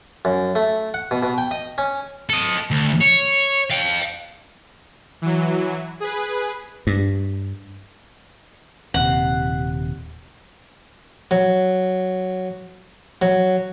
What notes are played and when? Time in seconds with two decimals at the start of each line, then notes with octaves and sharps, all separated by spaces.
0.25 F#2
0.55 A3
0.94 F#5
1.11 B2
1.23 B2
1.38 G5
1.51 D#5
1.78 C#4
2.30 A4 D#5
2.71 D2
3.01 C#5
3.71 F5 G5
5.22 E3 F#3
6.00 G#4 B4
6.87 G2
8.94 D#1 C3 F#5
11.31 F#3
13.22 F#3